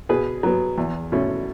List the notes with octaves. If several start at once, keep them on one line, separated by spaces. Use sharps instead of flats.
B2 G#4 B4
F#3 B3
E2
B2 A3 C#4